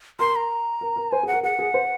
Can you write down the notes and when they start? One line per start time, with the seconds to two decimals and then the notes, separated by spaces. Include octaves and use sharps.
0.19 A#4 C6
0.36 A#5
0.81 A#4
0.96 A#4
1.12 C5 G#5
1.23 G#4
1.27 F#5
1.33 A#4
1.43 G#4 F#5
1.59 G#4
1.74 C5